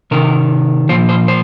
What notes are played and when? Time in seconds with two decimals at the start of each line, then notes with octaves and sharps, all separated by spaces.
0.11 C3 D#3 A#4
0.89 A#2 F3 C5
1.09 C5
1.28 C5